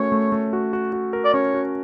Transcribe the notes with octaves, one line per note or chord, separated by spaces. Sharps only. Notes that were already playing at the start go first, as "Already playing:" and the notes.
Already playing: A3 C#4 F#4 A#4 C#5
A3
A3
F#4
F#4
F#4
A#4
D5
C#4 C#5
F#4